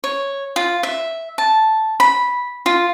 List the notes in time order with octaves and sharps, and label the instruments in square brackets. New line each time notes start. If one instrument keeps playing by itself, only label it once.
[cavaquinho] C#5
F4
E5
A5
B5
F4